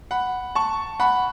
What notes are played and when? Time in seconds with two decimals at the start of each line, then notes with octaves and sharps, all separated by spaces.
0.11 F#5 B5
0.55 A5 C#6
1.00 F#5 B5